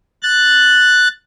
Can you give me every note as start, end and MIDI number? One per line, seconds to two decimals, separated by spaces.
0.23 1.08 90
0.23 1.08 93